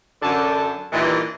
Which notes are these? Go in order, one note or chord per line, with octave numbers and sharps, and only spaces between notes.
F#2 D3 A5
G2 A#2 D#3 E3